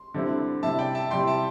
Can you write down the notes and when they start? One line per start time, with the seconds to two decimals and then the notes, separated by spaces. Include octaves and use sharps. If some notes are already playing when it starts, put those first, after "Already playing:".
Already playing: C6
0.14 D3 G3 C4 E4
0.63 C3 G3 E4 E5 A5
0.79 D5 G5
0.95 E5 A5
1.11 C3 G3 E4 G5 C6
1.27 E5 A5